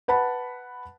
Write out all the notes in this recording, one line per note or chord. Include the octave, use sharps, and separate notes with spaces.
B4 F#5 A5 B5